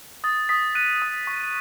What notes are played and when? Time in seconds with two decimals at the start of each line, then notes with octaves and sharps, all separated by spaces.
0.24 D#6 A6
0.49 D#6 B6
0.75 F#6 D#7
1.02 D#6
1.27 C#6